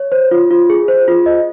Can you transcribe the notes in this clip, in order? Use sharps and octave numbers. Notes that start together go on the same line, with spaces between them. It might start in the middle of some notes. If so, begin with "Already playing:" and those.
Already playing: C#5
C5
F4
F4
G#4
C5
F4
D#5